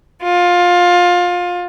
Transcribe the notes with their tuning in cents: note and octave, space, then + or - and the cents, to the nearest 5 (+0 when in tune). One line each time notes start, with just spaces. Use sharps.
F4 +20